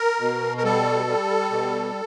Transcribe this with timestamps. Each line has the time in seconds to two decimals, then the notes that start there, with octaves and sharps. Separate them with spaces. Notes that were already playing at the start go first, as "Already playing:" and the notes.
Already playing: A#4
0.20 B2
0.58 A#4
0.64 G3 A4
1.07 G3
1.51 B2